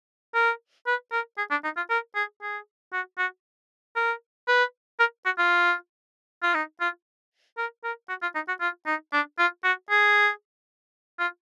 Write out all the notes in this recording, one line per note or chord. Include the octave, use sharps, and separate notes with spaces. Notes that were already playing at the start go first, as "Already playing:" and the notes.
A#4
B4
A#4
G#4
D4
D#4
F4
A#4
G#4
G#4
F#4
F#4
A#4
B4
A#4
F#4
F4
F4
D#4
F4
A#4
A#4
F#4
F4
D#4
F#4
F4
D#4
D4
F4
F#4
G#4
F4